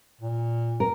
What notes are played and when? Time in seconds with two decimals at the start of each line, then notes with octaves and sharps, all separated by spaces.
0.21 A#2
0.80 A#4